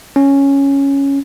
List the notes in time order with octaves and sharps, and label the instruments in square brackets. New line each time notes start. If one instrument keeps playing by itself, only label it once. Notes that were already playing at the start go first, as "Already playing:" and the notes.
[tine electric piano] C#4